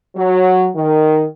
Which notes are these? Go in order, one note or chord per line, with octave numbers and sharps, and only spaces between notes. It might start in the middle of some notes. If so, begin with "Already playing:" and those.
F#3
D#3